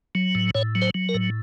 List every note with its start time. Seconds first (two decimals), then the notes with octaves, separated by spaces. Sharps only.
0.15 F#3
0.35 A2
0.55 A2 C#5
0.75 F#3
0.82 C5
0.94 F#3
1.09 A#4
1.14 A2